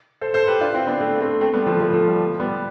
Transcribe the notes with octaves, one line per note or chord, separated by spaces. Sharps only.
A4 C5
A4 C5
G4 B4
D4 F4
C4 E4
B3 D4
A3 C4
A3 C4
A3 C4
G3 B3
F3 A3
F3 A3
F3 A3
G3
G3 B3